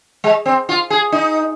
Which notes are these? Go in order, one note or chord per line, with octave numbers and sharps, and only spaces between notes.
G#3
C4
F4
G#4
D#4